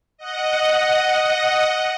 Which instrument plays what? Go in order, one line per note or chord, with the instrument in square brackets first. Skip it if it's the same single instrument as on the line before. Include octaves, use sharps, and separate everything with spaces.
[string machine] D#5 F#5